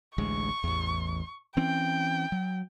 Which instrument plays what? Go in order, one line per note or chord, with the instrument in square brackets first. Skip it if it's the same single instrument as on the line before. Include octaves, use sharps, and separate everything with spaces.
[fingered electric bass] A1 D2 G#3 [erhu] C#6
[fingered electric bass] A1 E2
[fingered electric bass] E3 C4 C#4 [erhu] G5
[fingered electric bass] F#3